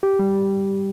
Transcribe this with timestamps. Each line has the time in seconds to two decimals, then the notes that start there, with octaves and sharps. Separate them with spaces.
0.03 G4
0.19 G3